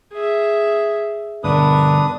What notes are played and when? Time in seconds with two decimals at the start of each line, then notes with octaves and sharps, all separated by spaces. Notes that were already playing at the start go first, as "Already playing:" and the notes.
0.12 G#4 E5
1.44 G1 B2 B3 D4 A#4 B4 D#6